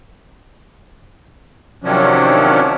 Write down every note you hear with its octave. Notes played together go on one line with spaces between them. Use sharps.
C3 D#3 F3 F#3 C#4 D4